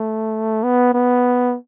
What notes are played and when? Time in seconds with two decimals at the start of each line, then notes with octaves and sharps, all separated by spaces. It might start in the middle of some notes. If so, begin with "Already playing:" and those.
Already playing: A3
0.63 B3
0.94 B3